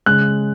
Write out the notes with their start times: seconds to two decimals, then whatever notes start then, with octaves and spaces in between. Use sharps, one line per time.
0.06 C#3 G#3 F#6